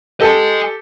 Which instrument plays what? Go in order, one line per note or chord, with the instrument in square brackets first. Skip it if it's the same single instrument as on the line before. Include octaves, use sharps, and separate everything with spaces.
[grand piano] G4 A4 [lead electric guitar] D#5 G#5